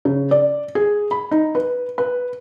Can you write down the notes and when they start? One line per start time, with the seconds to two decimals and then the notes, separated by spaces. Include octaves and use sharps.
0.05 C#3
0.31 D5
0.75 G#4
1.11 B5
1.31 D#4
1.55 B4
1.98 B4